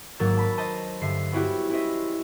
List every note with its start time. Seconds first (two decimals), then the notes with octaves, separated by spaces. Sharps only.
0.19 G#1 G#2 F#3 A#3 E6 A6
0.37 A5 B5
0.58 B4 C5 D#5 A5
1.02 G2 D3 E5 C7
1.32 B3 C#4 E4 F#4 G4
1.70 C#4 E4 C5 D#5 E5